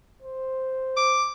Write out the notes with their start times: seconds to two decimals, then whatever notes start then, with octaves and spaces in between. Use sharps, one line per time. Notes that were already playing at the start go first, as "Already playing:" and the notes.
0.22 C5
0.97 D6